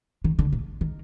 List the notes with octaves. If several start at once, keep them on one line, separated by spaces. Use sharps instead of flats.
D#3
D3
A#2
D#3